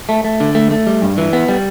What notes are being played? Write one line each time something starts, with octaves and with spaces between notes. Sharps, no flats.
A3
A3
D3
A3
A3
G3
G2
E3
B3
G3